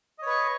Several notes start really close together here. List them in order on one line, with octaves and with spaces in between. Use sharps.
D#5 C#5 B4 C#6